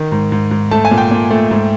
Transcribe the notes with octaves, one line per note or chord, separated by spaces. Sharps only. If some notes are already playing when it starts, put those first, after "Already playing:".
Already playing: D#3
G#2
G#2
G#2
A3 A5
G#5
A#2
G5
A#2
A3
G#2